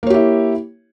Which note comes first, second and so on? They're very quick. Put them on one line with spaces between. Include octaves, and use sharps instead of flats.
A#3 C#5 G4 E4